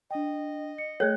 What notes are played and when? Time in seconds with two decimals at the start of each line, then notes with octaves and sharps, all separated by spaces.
0.11 D4 D#5 G5
0.78 C#7
1.00 A3 G#4 C#5 G5 F#6 G#6